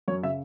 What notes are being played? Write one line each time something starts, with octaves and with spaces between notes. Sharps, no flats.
F#2 C#5
C#3 E5